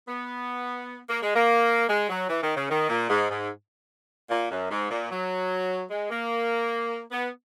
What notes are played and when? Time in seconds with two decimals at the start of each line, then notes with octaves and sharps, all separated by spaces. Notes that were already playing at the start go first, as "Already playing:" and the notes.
0.08 B3
1.09 A#3
1.23 G#3
1.35 A#3
1.89 G#3
2.10 F#3
2.29 E3
2.42 D#3
2.57 C#3
2.70 D#3
2.89 A#2
3.10 G#2
3.31 G#2
4.31 A#2
4.51 F#2
4.71 G#2
4.91 A#2
5.11 F#3
5.91 G#3
6.10 A#3
7.12 B3